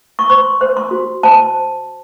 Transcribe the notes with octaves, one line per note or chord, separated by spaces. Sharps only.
C#6
C5 C6
C5
C6
F#4
C5 A5